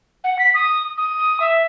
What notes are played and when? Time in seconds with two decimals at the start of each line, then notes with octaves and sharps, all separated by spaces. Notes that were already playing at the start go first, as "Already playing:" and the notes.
0.24 F#5
0.39 B6
0.54 D#6
0.97 D#6
1.40 E5